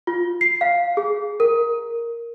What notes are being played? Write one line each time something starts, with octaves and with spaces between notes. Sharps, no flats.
F4
C7
F5
G#4
A#4